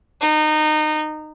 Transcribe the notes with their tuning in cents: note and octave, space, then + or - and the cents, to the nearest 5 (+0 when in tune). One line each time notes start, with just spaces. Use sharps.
D#4 -20